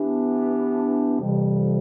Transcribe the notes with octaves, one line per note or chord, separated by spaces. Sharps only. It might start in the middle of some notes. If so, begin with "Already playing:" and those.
Already playing: E3 B3 D4 G4
F2 C3 E3 G3